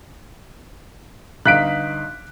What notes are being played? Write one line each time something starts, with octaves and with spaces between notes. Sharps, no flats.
G1 D#4 F5 F#6 B6 D7